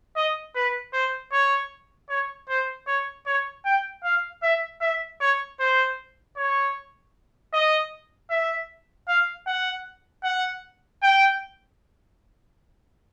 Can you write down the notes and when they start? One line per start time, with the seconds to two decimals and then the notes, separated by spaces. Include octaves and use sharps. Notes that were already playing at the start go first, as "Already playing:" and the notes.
0.16 D#5
0.56 B4
0.93 C5
1.32 C#5
2.10 C#5
2.49 C5
2.87 C#5
3.27 C#5
3.65 G5
4.04 F5
4.43 E5
4.81 E5
5.21 C#5
5.60 C5
6.37 C#5
7.53 D#5
8.30 E5
9.08 F5
9.47 F#5
10.24 F#5
11.02 G5